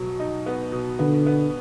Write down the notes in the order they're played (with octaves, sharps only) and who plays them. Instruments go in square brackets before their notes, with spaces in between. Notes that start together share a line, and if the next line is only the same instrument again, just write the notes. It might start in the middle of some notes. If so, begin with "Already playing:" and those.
Already playing: [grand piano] B2 F#3
D#4
B3
B2
[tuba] D3 [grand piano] B3
[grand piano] B3